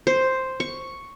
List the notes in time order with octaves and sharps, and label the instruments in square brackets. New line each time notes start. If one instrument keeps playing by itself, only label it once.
[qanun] C5
C#6